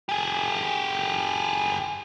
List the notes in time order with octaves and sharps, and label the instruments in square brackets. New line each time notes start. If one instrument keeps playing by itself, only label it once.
[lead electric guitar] G4 G#4